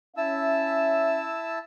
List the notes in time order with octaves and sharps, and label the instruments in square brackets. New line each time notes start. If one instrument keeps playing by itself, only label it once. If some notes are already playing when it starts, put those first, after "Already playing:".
[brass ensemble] C#4 E5 [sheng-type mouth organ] E4 A5 E6